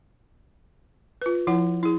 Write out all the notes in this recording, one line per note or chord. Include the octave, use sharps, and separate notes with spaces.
F4 B4
F3 E4 F#5
E4 G#4